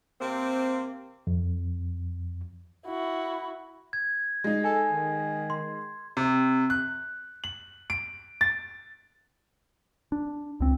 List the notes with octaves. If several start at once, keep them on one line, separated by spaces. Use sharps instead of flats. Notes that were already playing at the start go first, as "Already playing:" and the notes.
C3 A#3 C4
F2
E4 F#4
G#6
G#3 D#4
A4 G#5
D#3
C6
C3
F#6
F#7
D7
A6
D4
C#2 C4